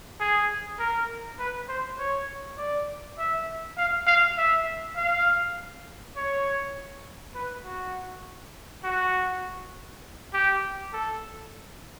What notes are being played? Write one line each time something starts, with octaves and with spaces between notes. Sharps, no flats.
G#4
A#4
B4
C5
C#5
D5
E5
F5
F5
E5
F5
C#5
B4
F#4
F#4
G4
A4